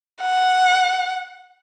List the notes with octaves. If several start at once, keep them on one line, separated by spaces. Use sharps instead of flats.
F#5